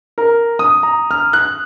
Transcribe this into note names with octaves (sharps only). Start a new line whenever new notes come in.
A#4
D#6
A#5
F6
F#6